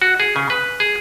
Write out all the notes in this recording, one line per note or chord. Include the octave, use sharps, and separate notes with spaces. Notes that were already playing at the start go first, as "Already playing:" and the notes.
F#4
G#4
C#3
B4
G#4